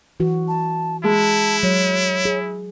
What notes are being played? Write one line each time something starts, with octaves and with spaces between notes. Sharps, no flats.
E3 F#4
A5
G#3 E4 A5
F#3 C#5
G#4